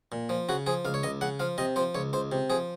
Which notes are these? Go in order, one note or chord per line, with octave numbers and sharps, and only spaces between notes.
A#2
F3
C#3 F#4
F3 G#4
C#2 F5
C#5
C#2 D#5
C#3 F#5
F3 F5
C3 D#5
F3 C5
C#2 C#5
C#2 C5
C3
F3 G#4